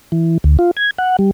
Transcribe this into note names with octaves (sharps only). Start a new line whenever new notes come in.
E3
D2
F4
G#6
F#5
G3